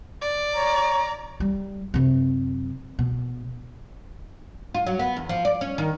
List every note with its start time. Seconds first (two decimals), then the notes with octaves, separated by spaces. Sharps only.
0.22 D5
0.55 C#5 A#5
1.40 G3
1.94 F#2 C3
2.99 B2
4.75 F4
4.87 F#3
4.99 B3
5.17 E2
5.29 F3
5.45 D5
5.61 C#4
5.78 D#3